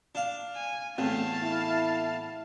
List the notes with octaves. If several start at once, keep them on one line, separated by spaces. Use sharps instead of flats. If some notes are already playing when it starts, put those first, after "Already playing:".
D4 F5
G#5
E2 A2 C4 F5 A5
E4